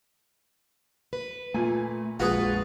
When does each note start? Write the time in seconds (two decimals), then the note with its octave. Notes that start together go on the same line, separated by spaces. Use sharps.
1.13 B4
1.54 A#2 A3 G#5
2.20 A#1 F2 G#3 F4 F#4 G#4 B4